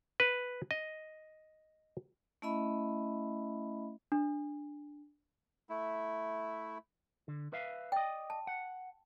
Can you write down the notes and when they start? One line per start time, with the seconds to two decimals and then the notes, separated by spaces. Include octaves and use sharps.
0.20 B4
0.71 D#5
2.42 A3 C#4 E4 D#5 E5 B5
4.12 D4
5.69 A3 E4
7.28 D3
7.53 B4 E5 F5
7.92 D5 D#5 G5
8.30 A5
8.47 F#5